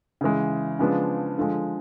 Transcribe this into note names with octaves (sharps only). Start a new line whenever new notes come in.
C#3 E3 G#3
C#3 F3 G#3 B3 D4
D3 F3 G#3